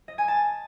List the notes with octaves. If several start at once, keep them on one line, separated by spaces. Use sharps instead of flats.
D#5
G#5
A5